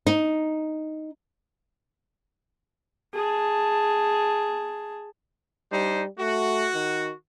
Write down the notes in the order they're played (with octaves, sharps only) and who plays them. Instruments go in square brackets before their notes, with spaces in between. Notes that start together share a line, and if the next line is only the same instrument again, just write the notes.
[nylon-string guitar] D#4
[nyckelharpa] G#4 A5
[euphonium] G3 [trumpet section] D4 D#4 C5
[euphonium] A3 [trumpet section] F#4
[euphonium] D#3